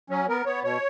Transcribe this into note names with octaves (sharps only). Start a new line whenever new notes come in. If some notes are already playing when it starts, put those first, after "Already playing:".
F#3 C#4
B3 A#4
B3 C#5
B2 C#5